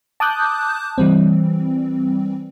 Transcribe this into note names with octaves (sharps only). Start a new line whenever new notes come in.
A5 D6 D#6 F#6 G6
E3 G3 C4